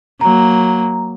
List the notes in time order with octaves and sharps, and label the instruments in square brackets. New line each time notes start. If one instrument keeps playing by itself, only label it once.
[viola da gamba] F#3 A#3 [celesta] A#5